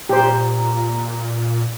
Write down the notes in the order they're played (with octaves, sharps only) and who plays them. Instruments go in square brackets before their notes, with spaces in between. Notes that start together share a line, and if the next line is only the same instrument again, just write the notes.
[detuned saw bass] A#2 [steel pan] G4 C5 [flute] A#5